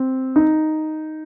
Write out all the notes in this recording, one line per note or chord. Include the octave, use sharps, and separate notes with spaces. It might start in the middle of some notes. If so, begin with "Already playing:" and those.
Already playing: C4
D#4